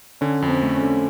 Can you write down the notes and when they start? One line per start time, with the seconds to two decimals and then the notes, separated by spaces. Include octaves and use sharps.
0.21 D3 C#4
0.42 F2
0.48 C4
0.62 A3
0.75 C#4
0.83 D3